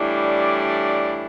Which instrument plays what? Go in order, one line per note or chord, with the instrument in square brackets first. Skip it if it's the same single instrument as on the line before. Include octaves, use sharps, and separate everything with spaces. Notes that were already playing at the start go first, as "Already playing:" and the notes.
Already playing: [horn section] A2 E3 G3 D4
D5